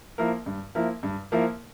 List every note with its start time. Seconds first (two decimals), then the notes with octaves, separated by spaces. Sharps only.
0.18 F3 A#3 E4 A#4
0.46 G2
0.75 F3 A#3 E4 A#4
1.03 G2
1.32 F3 A#3 E4 A#4